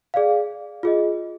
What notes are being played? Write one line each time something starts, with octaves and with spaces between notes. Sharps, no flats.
G#4 D5 F5
F4 G#4 D#5